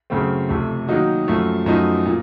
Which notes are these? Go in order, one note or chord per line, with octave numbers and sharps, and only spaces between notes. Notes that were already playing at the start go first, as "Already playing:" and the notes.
F#2 C#3 A3 C4
F2 C3 F3 A3
D#3 F#3 A#3 D#4 F#4
F#2 F3 A3
F#2 F3 A3 D#4
A#2